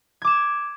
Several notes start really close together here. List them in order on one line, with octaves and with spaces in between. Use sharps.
G#6 D6 E7